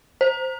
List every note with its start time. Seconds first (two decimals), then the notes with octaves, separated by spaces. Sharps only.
0.21 C5